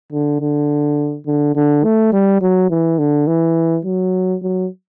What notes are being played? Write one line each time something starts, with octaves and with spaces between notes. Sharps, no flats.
D3
D3
D3
D3
A3
G3
F#3
E3
D3
E3
F#3
F#3